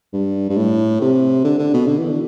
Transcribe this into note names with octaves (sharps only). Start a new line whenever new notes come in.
G2
G2
A2
C3
D3
D3
B2
D3
E3
D3